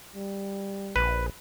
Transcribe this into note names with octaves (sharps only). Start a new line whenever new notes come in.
G3
A#1 B4